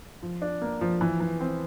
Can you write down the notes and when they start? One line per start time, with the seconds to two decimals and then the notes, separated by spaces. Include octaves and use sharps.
0.22 F3
0.42 D4
0.61 A#3
0.81 F3
1.01 E3
1.21 E3
1.41 C4